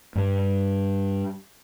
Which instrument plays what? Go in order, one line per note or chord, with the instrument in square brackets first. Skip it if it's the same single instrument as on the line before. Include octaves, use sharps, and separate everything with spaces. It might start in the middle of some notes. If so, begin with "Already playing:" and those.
[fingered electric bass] G2 G3